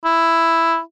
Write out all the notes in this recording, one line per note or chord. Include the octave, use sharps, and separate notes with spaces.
E4